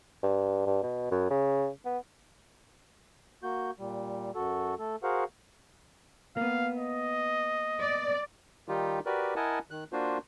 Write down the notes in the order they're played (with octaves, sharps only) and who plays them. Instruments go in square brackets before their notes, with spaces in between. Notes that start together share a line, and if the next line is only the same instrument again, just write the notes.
[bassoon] G2
G2
B2
F#2
C#3
B3
[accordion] A#3 F#4 G6
A#2 G3
F#2 F#4 A4
A3 A4
F#4 G#4 A#4 C5 F5 F#5
[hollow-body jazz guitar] A#3 B3 [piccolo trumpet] F5
[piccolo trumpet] D#5
[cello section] D5
[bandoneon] D#3 G3 D#4 F4 G4
F#4 G4 A#4 B4 D5
E4 A#4 D#5 F#5 G#5 A5
D#3 F#6
A#3 D4 F4 F#4 C5